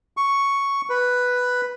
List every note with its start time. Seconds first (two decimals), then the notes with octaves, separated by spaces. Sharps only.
0.17 C#6
0.90 B4